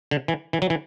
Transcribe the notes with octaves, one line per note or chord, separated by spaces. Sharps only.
D3
E3
E3
F#3
E3